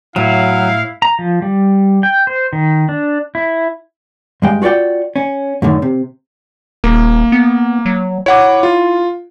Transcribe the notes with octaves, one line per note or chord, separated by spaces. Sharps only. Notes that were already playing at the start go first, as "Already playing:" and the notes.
A2 F#3 E4 F5
A#5
F3
G3
G5
C5
D#3
D4
E4
G2 G#3 G5
F4 F#4 C#5 D5 G5
C#4
F#2 A2 D3 D#3
C3
D#1 A#3
B3
F#3
E4 C#5 F#5 D6
F4